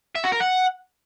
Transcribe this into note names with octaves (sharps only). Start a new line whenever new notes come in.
E5
F#4
A#4
F#5